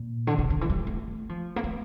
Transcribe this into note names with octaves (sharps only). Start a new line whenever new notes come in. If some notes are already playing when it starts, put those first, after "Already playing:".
Already playing: A#2
D3
C3
D3
E3
G3
A3
F3
A#3
A3